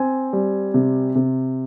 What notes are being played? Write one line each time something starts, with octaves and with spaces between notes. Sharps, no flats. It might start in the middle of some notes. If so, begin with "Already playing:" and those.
Already playing: C4 G#5
G3
C3
C3